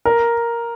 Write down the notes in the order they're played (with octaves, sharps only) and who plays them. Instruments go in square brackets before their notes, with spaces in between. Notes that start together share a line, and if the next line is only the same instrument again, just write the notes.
[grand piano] A#4